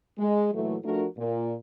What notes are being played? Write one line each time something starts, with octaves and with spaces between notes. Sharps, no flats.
G#3
A#2 E3 F#3 A3
F3 A3 D4 F#4 A#4
A#2